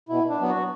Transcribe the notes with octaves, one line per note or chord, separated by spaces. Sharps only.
B2 E4
D4
F#3 B3
F#4